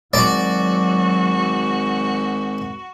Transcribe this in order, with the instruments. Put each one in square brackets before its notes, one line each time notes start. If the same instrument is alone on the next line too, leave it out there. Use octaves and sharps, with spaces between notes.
[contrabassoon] G#1 [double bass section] F#3 [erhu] F#4 [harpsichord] D5